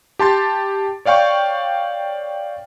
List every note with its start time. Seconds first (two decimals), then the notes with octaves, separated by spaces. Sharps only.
0.19 G4 A5 C6 A6
1.05 C#5 D5 F5 G5 C#6